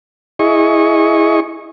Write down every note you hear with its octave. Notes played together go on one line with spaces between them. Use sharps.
E4 G#4 D#5 C#6